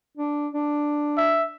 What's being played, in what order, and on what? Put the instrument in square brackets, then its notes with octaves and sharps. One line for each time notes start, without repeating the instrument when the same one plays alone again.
[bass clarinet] D4
D4
[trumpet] E5